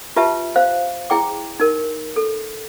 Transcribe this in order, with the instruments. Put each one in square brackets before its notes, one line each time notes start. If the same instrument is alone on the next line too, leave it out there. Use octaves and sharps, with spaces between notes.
[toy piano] F4 G4 B4 E5 A5
C5 F5
E4 G#4 G5 D6
D#4 A#4
A4